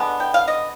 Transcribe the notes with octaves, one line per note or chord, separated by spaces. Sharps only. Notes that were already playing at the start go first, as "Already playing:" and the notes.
Already playing: D3 G#3 B3
G5
F5
D#5